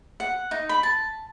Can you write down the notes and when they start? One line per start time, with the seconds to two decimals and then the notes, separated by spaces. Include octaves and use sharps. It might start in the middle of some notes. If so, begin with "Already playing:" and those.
0.20 F#5
0.51 D#4
0.69 B5
0.83 A5